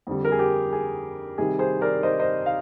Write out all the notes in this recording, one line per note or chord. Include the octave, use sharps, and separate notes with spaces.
F2 D3 G3
A#4
G#4
G4
G#4
C3 D#3 G3 G#4
G#4 C5
A#4 D5
C5 D#5
C5 D#5
F5